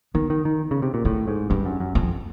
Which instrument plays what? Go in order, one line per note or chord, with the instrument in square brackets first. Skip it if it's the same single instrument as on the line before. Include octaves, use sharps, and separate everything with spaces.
[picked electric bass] D#3 [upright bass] B3
[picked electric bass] D#3
D#3
C#3
C3
A#2
[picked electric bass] A2 [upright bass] C4
[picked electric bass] G#2
[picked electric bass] G2 [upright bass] C#4
[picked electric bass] F#2
F#2
[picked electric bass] F2 [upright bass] C4